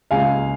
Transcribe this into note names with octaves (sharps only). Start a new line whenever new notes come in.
C#2 F5 G#5